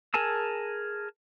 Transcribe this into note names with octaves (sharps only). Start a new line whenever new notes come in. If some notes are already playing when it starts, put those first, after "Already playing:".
G#4 A#4 G#5 A5 E6